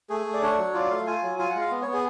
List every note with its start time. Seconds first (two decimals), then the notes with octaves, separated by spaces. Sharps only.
0.10 A3 G#4
0.26 A3
0.34 D5
0.42 D4 C#5
0.58 F#3
0.74 F4 D5
0.90 A3 F5
1.07 F4 G#5
1.23 F#3
1.39 F4 G#5
1.49 F#5
1.55 G#3
1.61 F5
1.71 B3
1.82 B3 C#5
1.93 G#4